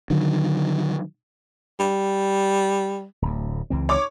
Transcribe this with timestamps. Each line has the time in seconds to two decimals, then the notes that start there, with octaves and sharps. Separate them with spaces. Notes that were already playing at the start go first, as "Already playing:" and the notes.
0.10 D3 D#3 F#3
1.80 G3
3.22 D1 D2
3.70 C#2 E3 C4
3.89 C#5 D6